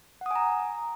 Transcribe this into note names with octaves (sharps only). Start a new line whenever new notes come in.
F#5 G#5 A#5 D#6